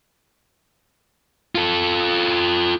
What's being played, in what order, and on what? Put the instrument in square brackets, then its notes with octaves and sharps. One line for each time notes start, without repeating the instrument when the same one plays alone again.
[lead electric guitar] F4 A4